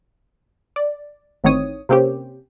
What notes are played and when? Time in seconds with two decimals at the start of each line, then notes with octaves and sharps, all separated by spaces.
0.76 D5
1.44 A1 A2 D#3 C4 C#5 D#6
1.89 C3 A#3 C4 C#4 G4